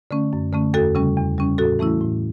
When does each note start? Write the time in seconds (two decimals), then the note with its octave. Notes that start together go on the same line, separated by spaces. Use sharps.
0.11 D3 A3 C#4
0.33 F#2
0.53 D3 A3 C#4
0.74 E2 F#4 A4
0.95 C#3 G3 C#4
1.17 E2
1.38 C#3 G3 C#4
1.58 A2 F#4 A4
1.79 E3 A3 C#4 E4
2.01 A2